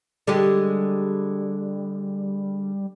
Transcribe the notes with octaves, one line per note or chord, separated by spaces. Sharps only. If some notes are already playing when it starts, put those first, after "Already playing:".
D3 G3 G#3 G4